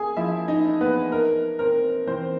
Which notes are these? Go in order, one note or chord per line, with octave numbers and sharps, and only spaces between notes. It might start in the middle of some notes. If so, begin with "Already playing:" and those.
Already playing: A#3 G#4 G#5
F3 E4 E5
D#4 D#5
D4
B3 B4
D#4 A#4
C4 A#4
E3 C4 C5